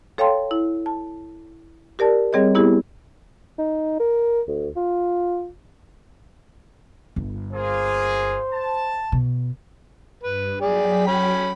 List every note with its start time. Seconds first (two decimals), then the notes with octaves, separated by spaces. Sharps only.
0.18 A4 C#5 F5 G5 A5 C6
0.51 E4
0.86 A5
1.99 G4 A#4 D5 A5
2.33 G3 C4 G#4 C#5 D#5
2.55 B3 E4 G4 G#4
3.58 D#4
3.99 A#4
4.47 D2
4.76 F4
7.16 G1
7.53 A#3 F4 G#4 C5
8.52 A5
9.12 B2
10.23 G2 B4
10.61 F#3 G#4 D5 G5 B6
11.07 C#4 B5